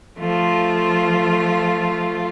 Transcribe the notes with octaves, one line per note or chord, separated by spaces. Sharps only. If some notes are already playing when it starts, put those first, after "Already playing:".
F3 A3 F4